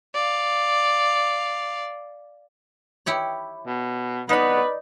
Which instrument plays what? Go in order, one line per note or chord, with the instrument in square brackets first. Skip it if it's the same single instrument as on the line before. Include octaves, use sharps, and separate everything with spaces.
[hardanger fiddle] D5 F5
[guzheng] E4 G4 C#5
[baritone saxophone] B2
[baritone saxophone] B3 [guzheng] D#4 B5 [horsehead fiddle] B4 D5